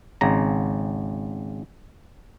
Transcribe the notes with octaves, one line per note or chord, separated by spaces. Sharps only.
G#1 C#3 A#5